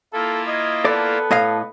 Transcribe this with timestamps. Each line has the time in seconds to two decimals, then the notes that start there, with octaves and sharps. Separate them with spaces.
0.13 A#3 E4 F4 A4
0.47 D#5 G#6
0.85 B3 A4 D5
1.31 A2 D#5 F5